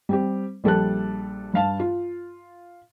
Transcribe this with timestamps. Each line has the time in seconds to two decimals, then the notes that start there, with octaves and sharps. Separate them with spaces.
0.09 G3 C4 G4
0.64 A#1 G3 A4 A5 F#6
1.54 G2 F5 A5
1.80 F4